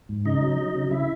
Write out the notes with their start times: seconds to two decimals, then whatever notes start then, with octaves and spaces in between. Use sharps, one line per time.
0.09 G#2
0.25 C#3 D#4 D#5
0.42 F#3
0.58 F#3
0.75 C#3
0.91 C#3 E4 E5